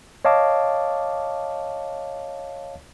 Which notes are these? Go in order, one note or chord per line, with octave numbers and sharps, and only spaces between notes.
C#5 D#5 F5 A5 D6